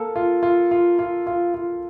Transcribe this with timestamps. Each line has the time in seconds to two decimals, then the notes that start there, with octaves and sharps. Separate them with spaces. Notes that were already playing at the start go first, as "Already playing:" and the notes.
Already playing: A#3 A4
0.16 F4
0.43 F4
0.71 F4
0.99 F4
1.27 F4
1.54 F4